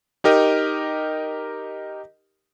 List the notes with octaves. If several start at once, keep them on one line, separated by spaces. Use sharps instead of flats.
D#4 G4 A#4 D#5